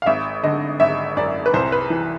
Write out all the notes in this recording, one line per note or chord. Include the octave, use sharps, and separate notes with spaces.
F5
G#1 E5
D3 D#5
G#1 E5
F#2 D5
B4
C2 C5
B4
E3